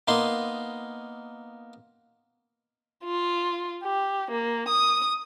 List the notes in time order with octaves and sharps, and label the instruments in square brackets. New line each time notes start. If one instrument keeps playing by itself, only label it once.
[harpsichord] A#3 B3 D#4 C6
[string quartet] F4
G4
A#3
D#6